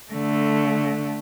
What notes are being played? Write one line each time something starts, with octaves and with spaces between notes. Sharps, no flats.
D3 A3